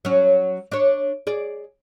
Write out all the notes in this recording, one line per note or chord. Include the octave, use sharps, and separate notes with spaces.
F#3 C#4
D4 C#5
G#4 D5